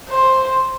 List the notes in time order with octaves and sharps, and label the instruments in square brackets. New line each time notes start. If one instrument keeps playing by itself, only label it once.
[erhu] C5